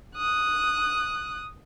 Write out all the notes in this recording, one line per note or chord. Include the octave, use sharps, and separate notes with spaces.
D#6 F#6